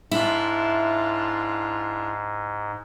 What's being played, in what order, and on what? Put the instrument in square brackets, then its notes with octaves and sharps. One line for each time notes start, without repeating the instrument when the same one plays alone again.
[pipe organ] G#2 [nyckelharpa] D4 F4 [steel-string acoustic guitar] E4